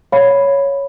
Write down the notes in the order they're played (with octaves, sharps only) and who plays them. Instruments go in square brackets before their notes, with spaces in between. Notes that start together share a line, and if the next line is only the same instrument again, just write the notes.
[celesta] C#5 F5 B5